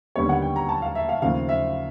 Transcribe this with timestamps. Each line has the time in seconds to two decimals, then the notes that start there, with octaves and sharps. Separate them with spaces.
0.16 D#2 D3 G3 B3 C#5
0.29 F#5
0.42 G5
0.56 A#5
0.69 A5
0.82 F5
0.95 E5
1.09 F5
1.22 D#2 C#3 F3 A3 C4 F5
1.49 E5